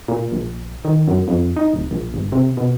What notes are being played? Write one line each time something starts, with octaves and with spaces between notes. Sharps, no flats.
A#2
A#1
D#3
F#2
F2
D#4
D1
A#1
G1
C3
B2